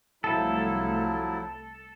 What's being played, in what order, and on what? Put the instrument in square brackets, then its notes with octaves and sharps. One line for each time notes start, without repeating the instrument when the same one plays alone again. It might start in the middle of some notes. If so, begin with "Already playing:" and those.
[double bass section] C2 A3 [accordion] F3 F#3 E4 [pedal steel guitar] A4